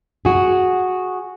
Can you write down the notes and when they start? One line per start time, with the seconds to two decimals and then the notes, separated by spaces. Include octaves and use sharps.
0.25 F#4 G#4